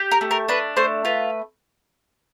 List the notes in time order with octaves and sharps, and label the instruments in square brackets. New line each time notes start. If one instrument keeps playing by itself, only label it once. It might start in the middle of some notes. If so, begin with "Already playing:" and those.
Already playing: [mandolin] G4
A#4
A3
A#4
D4 B4
A3 C5
F4 B4